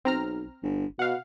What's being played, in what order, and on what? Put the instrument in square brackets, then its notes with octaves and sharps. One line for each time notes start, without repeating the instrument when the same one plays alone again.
[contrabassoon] B1 [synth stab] C4 A#5 F6
[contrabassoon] G1
[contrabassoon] B2 [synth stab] F5 F#5